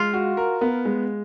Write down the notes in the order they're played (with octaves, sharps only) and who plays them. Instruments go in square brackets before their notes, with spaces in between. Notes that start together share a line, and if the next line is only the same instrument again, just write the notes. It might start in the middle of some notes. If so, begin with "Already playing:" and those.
Already playing: [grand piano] G#3 [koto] F4
[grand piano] F#4
A#4
B3
G#3